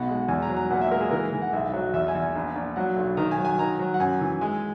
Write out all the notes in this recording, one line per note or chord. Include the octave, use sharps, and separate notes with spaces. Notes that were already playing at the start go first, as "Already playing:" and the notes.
Already playing: B1 B2 F#5
G#3
E2 G#5
A#5
F#3
A#5
A#2 F#5
E5
G#3 A#4
G#4
E3 A#4
E3
F#5
B1 E5
F#3
E2 E5
G#5
E2
G#5
A#1
A#1
F#3 F#5
B1
D#3 A#5
G#5
F#3
G#5
D#3 A#5
F#3
F#5
F#2 G#5
E3
G#3 G#5